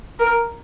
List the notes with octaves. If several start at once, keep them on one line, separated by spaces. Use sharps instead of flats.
A#4